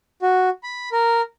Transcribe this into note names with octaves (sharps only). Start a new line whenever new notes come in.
F#4
B5
A#4